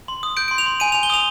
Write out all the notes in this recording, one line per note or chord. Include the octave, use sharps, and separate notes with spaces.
C6
D#6
G6 D7
C6 D7
F7
C6
G#5 D#7
G#5 F7
G7
D#6 F7